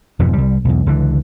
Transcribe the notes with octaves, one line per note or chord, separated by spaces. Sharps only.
E1 F2 G#2 B2
C2 G3
B1 E2
C#2 D3 E3